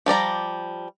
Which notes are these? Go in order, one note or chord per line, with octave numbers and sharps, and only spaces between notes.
F3 G3 D5 A#5